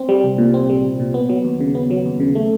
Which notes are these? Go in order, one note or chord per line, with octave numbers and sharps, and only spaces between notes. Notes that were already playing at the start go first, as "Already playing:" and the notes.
Already playing: C4
G3
C2
A#2
C4
G3
C2
A#2
B3
F#3
D#2
C#3
B3
F#3
D#2
C#3
A3